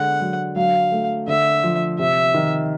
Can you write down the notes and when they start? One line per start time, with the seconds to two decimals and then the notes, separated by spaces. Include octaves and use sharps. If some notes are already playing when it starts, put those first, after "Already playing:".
Already playing: D3 G#3 F#5
0.21 F#3
0.56 F#3 F5
0.92 A3
1.27 D3 E5
1.63 F3
1.99 C3 E5
2.35 D#3